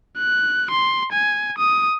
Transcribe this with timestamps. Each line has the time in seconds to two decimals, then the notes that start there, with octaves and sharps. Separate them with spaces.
0.18 F#6
0.71 C6
1.12 G#5
1.58 D#6